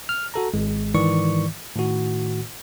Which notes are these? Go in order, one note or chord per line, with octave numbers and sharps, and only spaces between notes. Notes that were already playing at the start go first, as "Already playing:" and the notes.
F6
F#4 A4 A#5
G#1 G#3
G#2 D#3 E3 D5 C#6
A2 D#3 F#4